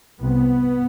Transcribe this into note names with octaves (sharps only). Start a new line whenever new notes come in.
C2 C3 B3